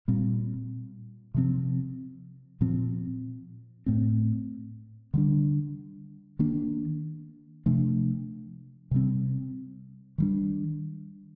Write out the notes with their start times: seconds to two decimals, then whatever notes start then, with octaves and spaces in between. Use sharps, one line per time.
0.08 A#2 G3 C4
1.34 C3 F3 C4
2.61 A#2 F3 C4
3.86 A2 A3 C4
5.14 D3 G3 D4
6.39 D#3 A#3 D4
7.66 C3 F3 A3 D4
8.91 C3 G3 C4
10.18 D#3 G3 D4